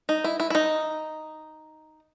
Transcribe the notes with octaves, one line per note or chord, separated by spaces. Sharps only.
D#4
E4
E4
E4
D#4